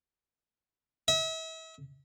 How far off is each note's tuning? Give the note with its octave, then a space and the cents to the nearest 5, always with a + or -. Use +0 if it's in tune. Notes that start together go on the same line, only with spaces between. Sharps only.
E5 -40